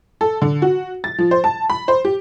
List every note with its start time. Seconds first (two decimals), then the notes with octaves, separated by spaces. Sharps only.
0.21 A4
0.42 D3
0.62 F#4
1.04 A6
1.18 F3
1.31 C5
1.44 A5
1.70 B5
1.88 C5
2.05 G4